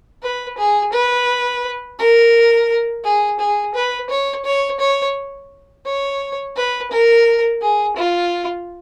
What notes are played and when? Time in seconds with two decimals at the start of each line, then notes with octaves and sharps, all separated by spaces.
0.22 B4
0.58 G#4
0.93 B4
1.99 A#4
3.04 G#4
3.39 G#4
3.74 B4
4.09 C#5
4.45 C#5
4.80 C#5
5.85 C#5
6.56 B4
6.91 A#4
7.61 G#4
7.96 F4